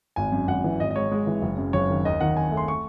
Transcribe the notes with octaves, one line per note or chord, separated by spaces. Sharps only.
G#1 G#5
F#2
G#1 F#5
E3
G#1 D#5
D#5
G#2 C#5
G#3
E3
F#1
F#2
F#1 C#5
D#3
D#2 D#5
D#3 F#5
D#2 G#5
A3
C6
C#6